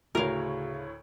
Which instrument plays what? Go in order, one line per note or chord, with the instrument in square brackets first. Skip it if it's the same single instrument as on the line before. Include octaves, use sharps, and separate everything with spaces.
[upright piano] D2 A2 C#5 [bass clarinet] C#3 [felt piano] F#4 [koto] A#4 F5